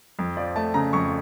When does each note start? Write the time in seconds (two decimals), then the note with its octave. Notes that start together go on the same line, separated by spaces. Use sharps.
0.19 F2
0.37 F3 D5
0.56 A3 A5
0.74 C#3 A#5
0.93 F2 C#6